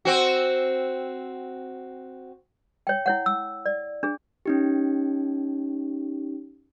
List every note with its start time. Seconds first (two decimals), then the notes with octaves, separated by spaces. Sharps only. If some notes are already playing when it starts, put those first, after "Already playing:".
0.05 C4 F#4
2.87 C#5 G5
3.06 E4 C#5 F#5
3.26 E6
3.66 D5
4.03 D4 G#4
4.46 C#4 D#4 G4